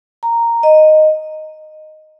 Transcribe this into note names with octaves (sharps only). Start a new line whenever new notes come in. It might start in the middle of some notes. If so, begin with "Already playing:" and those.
A#5
D#5